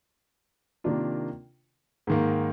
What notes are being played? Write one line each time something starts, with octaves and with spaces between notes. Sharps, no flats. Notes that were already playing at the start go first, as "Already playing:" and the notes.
C3 D#3 A#3 D4 F4
G#2 D#3 A#3